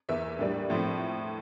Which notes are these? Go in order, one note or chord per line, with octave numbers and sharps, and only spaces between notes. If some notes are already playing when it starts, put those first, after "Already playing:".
E2 E3 A#3 E5
A2 G3 A#3 D4
A2 F3 A3 C4